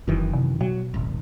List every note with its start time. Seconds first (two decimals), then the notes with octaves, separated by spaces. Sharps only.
0.08 F1 F#2 D#3 E3
0.33 C3
0.61 B2 F#3
0.94 D#1 G#1